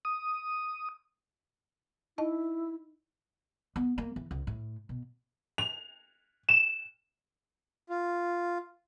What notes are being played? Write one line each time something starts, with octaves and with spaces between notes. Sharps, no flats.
D#6
D#4 E4 D#5 A5
B3
A#3
E3
C#2
A2
B2
F7
E7
F4